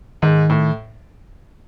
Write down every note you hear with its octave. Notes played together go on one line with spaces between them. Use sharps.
G#2 D#3
A2